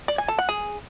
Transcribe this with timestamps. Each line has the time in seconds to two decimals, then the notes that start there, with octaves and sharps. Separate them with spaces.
0.08 D5
0.18 G#5
0.28 A4
0.39 F#5
0.49 G#4